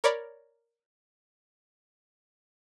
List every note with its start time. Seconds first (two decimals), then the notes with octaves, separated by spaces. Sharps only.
0.04 A#4 C#5 D5 B5